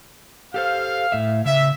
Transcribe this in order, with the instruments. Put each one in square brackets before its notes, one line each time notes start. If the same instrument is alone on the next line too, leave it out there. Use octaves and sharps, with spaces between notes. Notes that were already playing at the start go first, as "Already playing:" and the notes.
[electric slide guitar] G4 A4 C5 [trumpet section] F5
[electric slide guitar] A2 E5
[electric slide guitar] C#3 [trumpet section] E5